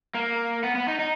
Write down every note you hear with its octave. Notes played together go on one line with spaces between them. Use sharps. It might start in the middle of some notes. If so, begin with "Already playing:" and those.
A#3
B3
B3
D#4
D#4